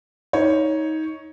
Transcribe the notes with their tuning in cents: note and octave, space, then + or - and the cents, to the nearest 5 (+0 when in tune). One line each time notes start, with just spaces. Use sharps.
D#4 +20 C#5 +0